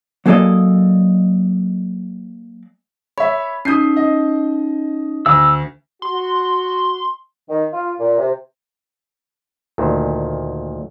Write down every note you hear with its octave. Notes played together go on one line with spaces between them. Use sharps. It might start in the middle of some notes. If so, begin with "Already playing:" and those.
F#3 A#3 G#4 A4 D5 D#5
C#5 E5 B5
C#4 D#4 D#6 G6 C7
D#5
D2 E6
F#4 C6
D#3
F4
A#2
C3
D2 A#2 D#3